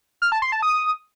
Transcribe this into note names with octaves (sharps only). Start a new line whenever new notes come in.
F6
A5
C6
A5
D#6